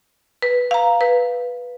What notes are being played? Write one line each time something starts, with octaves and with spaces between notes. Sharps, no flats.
B4
F5 A#5
B4